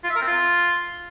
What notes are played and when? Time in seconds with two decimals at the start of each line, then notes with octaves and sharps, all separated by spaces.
0.04 F4
0.10 E5
0.16 A#4
0.21 C4
0.27 F4